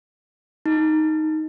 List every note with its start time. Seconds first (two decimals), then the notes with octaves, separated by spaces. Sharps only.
0.66 D#4